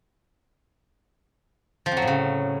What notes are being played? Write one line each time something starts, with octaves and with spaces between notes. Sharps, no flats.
F3
F2
F#3
A2
C#3